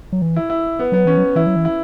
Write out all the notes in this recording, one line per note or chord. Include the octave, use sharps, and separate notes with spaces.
F#3
E3
E4
E4
B3
F#3 B3
E3 C#4
F#3
E3 E4
F#3
E3
E4